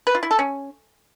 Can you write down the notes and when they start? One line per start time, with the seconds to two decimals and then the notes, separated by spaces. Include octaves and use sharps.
0.07 B4
0.15 F4
0.23 E4
0.31 A4
0.39 C#4